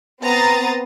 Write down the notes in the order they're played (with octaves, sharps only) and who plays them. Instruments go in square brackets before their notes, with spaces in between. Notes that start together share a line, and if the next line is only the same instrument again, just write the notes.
[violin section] B3 C4 A#5 C6 D#6 A6